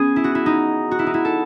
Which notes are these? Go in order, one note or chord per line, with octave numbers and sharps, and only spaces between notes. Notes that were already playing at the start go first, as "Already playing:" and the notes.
Already playing: B3 C#4 G#4
E4
F#4
E4
D#4
F#4
E4
D#4
E4
A4